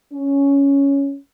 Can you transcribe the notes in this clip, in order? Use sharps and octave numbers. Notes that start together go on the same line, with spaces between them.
C#4